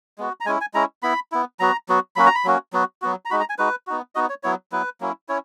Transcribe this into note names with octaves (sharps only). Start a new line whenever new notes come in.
G#3 B3 F#4
A#5
G#3 C#4 E4 G#5
G#5
G#3 C#4 E4 A#5
B3 E4 B5
B3 E4
F#3 B3 F#4 A#5
F#3 B3 F#4
F#3 A#3 C#4 F#4 B5
A#5
B5
F#3 A#3 C#4 F#4
F#3 B3 F#4
F#3 B3 F#4
A#5
G#3 D#4 F#4 B5
A#5
G#5
G#3 D#4 F#4 B4
B3 D#4 F#4
B3 D#4 F#4 D#5
C#5
F#3 B3 E4 C#5
F#3 B3 E4 B4
F#3 A#3 C#4 E4
C#4 E4 C#5